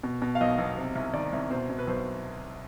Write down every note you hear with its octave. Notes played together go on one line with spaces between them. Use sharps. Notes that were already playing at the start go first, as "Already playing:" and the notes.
B2
B2
F5
B1 D#5
B1
C3
C2
D#3 D5
C2
B2 C5
B2
B4
B1 C5